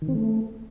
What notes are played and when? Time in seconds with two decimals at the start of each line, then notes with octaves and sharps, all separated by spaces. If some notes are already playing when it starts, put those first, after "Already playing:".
0.02 D#3
0.08 C4
0.15 A3